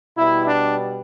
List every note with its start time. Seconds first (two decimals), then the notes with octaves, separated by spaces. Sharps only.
0.17 B2 G3 E4
0.46 D4